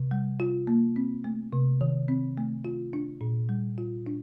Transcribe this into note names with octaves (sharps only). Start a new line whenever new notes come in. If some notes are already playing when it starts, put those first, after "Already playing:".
Already playing: C3
G3
F4
A#3
C4
A3
C3
D#3
C4
A3
F4
D4
A#2
G3
F4
D4